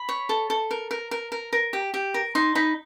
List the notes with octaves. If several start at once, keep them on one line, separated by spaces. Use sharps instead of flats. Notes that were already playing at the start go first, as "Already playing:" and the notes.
Already playing: B5
C#5
A4
A4
A#4
A#4
A#4
A#4
A#4
G4
G4
A#4
D#4 C6
D#4 B5